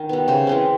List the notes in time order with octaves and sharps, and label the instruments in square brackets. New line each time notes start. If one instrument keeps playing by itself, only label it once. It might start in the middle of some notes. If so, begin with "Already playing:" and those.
Already playing: [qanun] D#3
G3 B3
C#3 C5
E3 G#3 C4